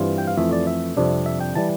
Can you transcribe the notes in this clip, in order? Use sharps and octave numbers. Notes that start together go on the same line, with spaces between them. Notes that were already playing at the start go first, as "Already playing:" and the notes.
Already playing: G2 E3 G3 C4 F4
G5
F5
F2 E3 A3 E5
D5
E5
F2 C3 G3 D4
E5
G5
E3 G3 A5